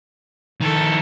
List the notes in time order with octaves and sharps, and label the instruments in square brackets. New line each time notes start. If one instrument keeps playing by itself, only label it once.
[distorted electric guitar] D#3 E4 [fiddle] A4